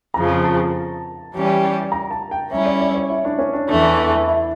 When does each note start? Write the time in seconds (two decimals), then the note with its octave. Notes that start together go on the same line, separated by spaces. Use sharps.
0.14 F2 C#3 F3 A#5
0.44 A5
1.33 E3 G3 C#4 G4
1.92 A#5
2.11 A5
2.31 G5
2.50 G3 C#4 E4 E5
2.66 D5
2.80 D5
2.95 C#5
3.10 E4
3.25 D4
3.39 C#4
3.53 D4
3.69 E2 E3 A3 D4
3.98 E4
4.28 E4